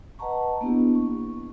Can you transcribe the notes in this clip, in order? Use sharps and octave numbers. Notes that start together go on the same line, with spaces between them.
B4 D#5 F#5 A5 A#5 C#6
A#3 B3 D4 E4 G4
C#6